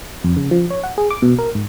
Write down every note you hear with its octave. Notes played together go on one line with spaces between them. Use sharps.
F2
C#3
F3
C#5
F#5
G#4
D6
B2
A#4
G#2